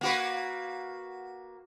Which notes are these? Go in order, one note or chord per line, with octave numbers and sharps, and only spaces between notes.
A#3 F#4 B4